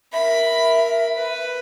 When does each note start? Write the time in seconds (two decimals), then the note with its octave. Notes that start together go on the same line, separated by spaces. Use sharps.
0.13 A#4 E5 B5
1.15 B4